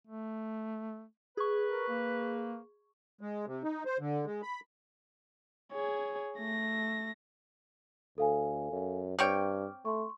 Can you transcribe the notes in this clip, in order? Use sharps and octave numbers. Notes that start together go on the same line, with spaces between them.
A3
G#4 B4 C#6
A#4
A#3
G#3
C3
D#4
C5
D3
G#3
B5
G#4 C#5
A3 A#6
D2 A4 F5 G#5
F#2
G2 C4 C#5 G5 D6 F6
A3 C6 C#6